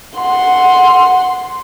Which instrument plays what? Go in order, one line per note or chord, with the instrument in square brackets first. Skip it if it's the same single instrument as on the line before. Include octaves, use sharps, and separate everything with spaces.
[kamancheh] F#5 C6